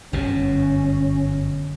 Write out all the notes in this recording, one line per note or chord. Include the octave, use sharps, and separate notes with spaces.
G1 F#2 B2 C#4